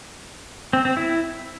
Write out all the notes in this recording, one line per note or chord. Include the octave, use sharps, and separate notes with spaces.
C4
C4
E4